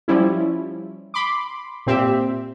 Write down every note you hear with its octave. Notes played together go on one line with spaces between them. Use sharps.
F3 G3 C#4 E4
B5 C6 D6
A#2 C4 G4 E5